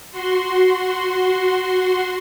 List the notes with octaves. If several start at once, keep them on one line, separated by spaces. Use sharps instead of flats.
F#4 C6